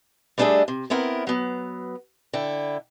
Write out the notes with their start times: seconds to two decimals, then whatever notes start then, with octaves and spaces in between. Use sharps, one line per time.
0.38 G3 A3 D4 G#4 D#5 E5
0.68 C3
0.90 B3 C4 E4 A#4 F#5
1.27 F#3 B3
2.33 D3 E4 G5